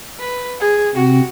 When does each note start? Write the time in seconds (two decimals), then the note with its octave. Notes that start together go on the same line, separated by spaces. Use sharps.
0.20 B4
0.60 G#4
0.95 C3 C4 F#4